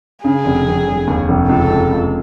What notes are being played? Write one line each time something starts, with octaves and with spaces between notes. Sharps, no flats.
C#3 G#4
F1
F1
F1
D#2
F1
C#2 A4
C#2
C#2